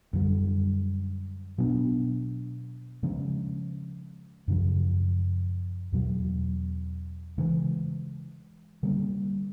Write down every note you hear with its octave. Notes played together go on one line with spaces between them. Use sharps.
F#2 D3 G3
B2 F#3 B3 D4
C#3 F3 G#3 C#4
F#2 C#3 F3
E2 B2 F#3
C#3 E3 G#3
D3 G3 A#3